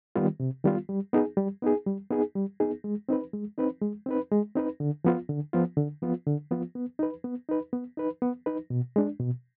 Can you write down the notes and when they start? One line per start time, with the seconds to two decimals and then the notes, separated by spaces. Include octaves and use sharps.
0.16 D#3 G3 B3 F4
0.40 C3
0.64 D#3 G3 B3 F4
0.89 G3
1.13 B3 D#4 G#4
1.37 G3
1.62 B3 D#4 G#4
1.87 G3
2.10 B3 D#4 G#4
2.35 G3
2.60 B3 D#4 G#4
2.84 G#3
3.09 C4 D#4 B4
3.33 G#3
3.58 C4 D#4 B4
3.82 G#3
4.06 C4 D#4 B4
4.32 G#3
4.55 C4 D#4 B4
4.80 D3
5.04 F3 B3 F4
5.29 D3
5.53 F3 B3 F4
5.77 D3
6.02 F3 B3 F4
6.27 D3
6.51 F3 B3 F4
6.75 B3
6.99 D#4 B4
7.24 B3
7.49 D#4 B4
7.73 B3
7.97 D#4 B4
8.22 B3
8.46 D#4 B4
8.70 B2
8.96 G#3 D4
9.20 B2